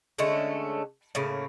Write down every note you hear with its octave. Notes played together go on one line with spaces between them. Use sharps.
D3 G#3 A3 C#4
A2 C#3 A#3